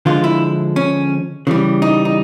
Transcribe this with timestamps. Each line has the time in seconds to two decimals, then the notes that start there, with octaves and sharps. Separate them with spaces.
0.06 D3 F3 G#3 F4
0.24 E4
0.76 C#4
1.47 C#3 E3 G3
1.82 D#4
2.05 D#4